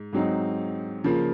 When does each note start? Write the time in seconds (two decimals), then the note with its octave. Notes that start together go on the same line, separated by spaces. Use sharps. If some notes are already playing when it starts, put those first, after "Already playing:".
Already playing: G#2
0.13 G#2 F#3 C4 D#4
1.04 C#3 F3 A#3